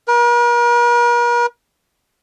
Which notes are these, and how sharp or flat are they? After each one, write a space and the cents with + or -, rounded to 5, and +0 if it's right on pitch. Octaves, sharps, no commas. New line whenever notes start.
A#4 +45